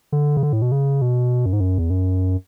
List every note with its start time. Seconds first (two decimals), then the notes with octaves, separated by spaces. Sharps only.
0.12 D3
0.37 C#3
0.43 D3
0.53 A2
0.62 B2
0.72 C#3
1.02 B2
1.46 F#2
1.53 G#2
1.60 F#2
1.78 E2
1.90 F#2